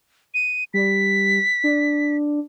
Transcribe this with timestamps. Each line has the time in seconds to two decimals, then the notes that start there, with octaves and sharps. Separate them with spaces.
0.34 D#7
0.74 G3 B6
1.64 D4